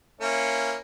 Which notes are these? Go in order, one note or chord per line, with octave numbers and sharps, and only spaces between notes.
A#3 C#4 E4